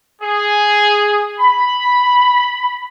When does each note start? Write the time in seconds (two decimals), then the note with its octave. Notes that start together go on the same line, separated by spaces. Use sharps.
0.21 G#4
1.39 B5